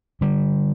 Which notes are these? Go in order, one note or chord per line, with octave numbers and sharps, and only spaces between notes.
D3 G3